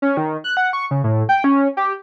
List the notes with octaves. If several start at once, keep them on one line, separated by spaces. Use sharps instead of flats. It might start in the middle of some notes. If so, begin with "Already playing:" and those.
C#4
D#3
F#6
F#5
C#6
C#3
A2
G5
C#4
G4